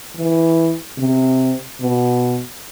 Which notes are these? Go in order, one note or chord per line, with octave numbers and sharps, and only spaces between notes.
E3
C3
B2